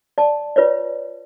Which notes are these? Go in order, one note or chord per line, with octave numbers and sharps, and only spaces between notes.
D5 A5
F4 B4 C#5 D5